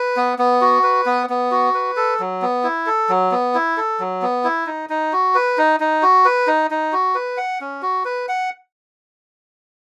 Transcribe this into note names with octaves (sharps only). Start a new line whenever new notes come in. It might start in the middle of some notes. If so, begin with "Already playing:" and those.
Already playing: B4
B3
B3
F#4
B4
B3
B3
F#4
B4
A4
F#3
B3
E4
A4
F#3
B3
E4
A4
F#3
B3
E4
D#4
D#4
F#4
B4
D#4
D#4
F#4
B4
D#4
D#4
F#4
B4
F#5
C#4
F#4
B4
F#5